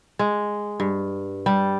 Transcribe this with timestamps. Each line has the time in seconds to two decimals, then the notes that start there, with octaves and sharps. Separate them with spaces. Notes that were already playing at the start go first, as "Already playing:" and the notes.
0.19 G#3
0.80 G2
1.46 G3